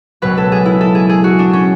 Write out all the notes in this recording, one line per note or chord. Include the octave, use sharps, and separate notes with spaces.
C#2 B2 F#3 B4
A4
G#4
E4
A4
G#4
G#4
F#4
D4
C#4